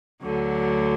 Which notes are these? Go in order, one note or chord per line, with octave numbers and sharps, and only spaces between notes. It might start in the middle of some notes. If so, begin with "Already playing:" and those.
D2 D3 F#3